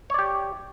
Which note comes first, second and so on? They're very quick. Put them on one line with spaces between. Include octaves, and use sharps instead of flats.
C#5 D5 G4